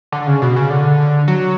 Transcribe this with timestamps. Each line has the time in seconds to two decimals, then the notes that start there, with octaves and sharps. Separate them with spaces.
0.12 D3
0.27 C#3
0.42 B2
0.56 C#3
0.70 D3
1.28 F#3